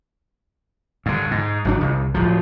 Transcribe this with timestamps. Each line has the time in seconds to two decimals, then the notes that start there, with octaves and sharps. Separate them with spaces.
1.06 G2 D3
1.31 G#2
1.65 G#1 F#3 D4
1.81 C2
2.14 D1 F3